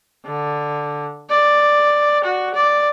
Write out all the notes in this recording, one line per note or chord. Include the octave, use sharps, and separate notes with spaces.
D3
D5
F#4
D5